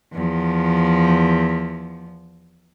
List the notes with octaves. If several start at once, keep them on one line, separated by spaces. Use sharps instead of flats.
E2 F3